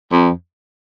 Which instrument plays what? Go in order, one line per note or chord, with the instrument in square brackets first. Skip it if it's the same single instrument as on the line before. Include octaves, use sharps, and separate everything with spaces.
[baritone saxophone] F2